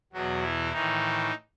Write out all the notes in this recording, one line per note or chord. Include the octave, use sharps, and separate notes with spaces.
E2 B2 F#3 F#4
E3 E4
A2 D#3 E3 D#4